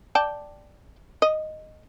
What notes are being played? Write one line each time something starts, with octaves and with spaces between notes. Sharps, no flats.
D5 G5 A5
D#5